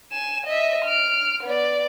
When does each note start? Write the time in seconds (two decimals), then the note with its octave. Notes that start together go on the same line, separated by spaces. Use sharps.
0.12 G#5 E7
0.45 D#5 E5
0.85 F6 D7
1.43 B3 D5